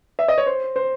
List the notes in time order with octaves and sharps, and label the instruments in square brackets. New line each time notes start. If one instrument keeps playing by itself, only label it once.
[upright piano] E5
D#5
C#5
C5
C5